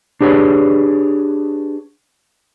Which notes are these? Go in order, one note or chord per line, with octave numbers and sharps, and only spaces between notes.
D4 G4 G#4 B4 C#5